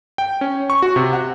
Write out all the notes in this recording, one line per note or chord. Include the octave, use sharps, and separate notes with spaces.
G5
C#4
C#6
F#4
C3
F#5